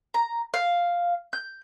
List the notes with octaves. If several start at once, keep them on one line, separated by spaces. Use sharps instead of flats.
A#5
F5
G6